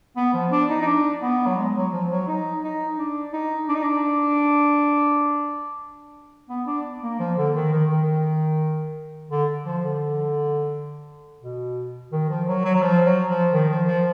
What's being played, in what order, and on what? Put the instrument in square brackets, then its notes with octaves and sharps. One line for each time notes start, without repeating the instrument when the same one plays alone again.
[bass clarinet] B3
F3
D4
D#4
D#4
D4
B3
F#3
G#3
F#3
F3
F#3
D#4
D#4
D4
D#4
D4
D#4
D4
B3
D4
A#3
F3
D3
D#3
D#3
D#3
D3
F3
D3
B2
D#3
F3
F#3
F#3
F#3
F3
F#3
F3
D#3
F3
F3